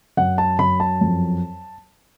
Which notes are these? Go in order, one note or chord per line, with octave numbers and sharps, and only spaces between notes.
F#2 F#5
A5
F#2 B5
A5
F2